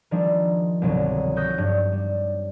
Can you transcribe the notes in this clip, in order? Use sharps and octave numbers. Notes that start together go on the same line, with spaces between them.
D#3 F3 G3 G#3 D4
G1 C2 B2 D#3 F3 F#3
C#6 D#6 E6 F#6 G6 A#6
G2
G3